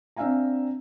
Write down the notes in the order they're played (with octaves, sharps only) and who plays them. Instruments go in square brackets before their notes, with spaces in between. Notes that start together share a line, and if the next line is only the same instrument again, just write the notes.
[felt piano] C4 D4 E5 F5 G#5 A#5